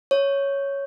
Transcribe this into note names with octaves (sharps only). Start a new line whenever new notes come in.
C#5